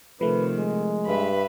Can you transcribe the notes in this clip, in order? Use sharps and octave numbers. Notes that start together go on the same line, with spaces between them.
C3 D#3 F3 A3 B4
G#3
G2 B4 E5 B5